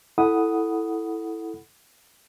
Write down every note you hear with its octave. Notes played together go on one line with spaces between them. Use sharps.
E4 A4 F#5 B5 D#6